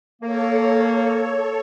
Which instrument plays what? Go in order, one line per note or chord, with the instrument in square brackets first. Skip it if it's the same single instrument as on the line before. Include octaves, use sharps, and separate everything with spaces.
[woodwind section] A#3 [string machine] A4 C#5